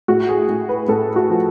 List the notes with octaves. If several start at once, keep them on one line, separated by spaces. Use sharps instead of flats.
A2 F#4
G#4
A2
B4
A2 A4
F#4
F3